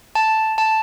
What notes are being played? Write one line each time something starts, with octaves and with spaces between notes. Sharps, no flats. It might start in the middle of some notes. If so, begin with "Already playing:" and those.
A5
A5